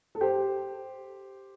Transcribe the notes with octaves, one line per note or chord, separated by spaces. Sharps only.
A4
G4 C5